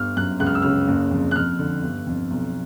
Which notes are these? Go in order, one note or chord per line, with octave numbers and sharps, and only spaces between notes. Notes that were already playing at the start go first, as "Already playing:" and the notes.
Already playing: G1 F6
F#2 F#6
C#2 F#6
F6
E6
C#3 F6
F#1
F2
F#6
F2 F6
D3
G1
F2
B1